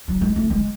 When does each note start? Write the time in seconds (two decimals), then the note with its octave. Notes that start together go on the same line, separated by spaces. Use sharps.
0.08 F#3
0.21 G#3
0.36 A3
0.50 G#3